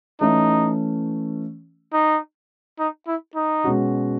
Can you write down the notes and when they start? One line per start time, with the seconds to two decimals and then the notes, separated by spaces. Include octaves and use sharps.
0.20 E3 A3 C#4 D#4
1.93 D#4
2.79 D#4
3.07 E4
3.35 D#4
3.64 B2 G#3 C#4 F#4